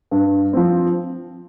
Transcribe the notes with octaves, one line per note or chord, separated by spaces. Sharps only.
G2
F3 C4